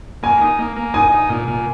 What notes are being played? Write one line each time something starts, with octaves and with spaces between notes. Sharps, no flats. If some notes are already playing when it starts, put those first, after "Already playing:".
A#3 G#5
D#4
A#3
A#3
D#4 G#5
D#4
A#2
A#2